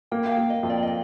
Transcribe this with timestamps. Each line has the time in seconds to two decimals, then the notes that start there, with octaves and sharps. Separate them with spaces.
0.11 A#3 G5
0.26 F5
0.31 G5
0.38 A#3
0.50 D#5
0.63 F2
0.70 D5
0.83 D#5